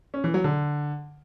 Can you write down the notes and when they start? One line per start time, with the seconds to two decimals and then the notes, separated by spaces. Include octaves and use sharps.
0.14 C#4
0.24 E3
0.34 F#3
0.44 D3